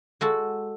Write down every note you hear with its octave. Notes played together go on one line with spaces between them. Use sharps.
G#3 F#4 A4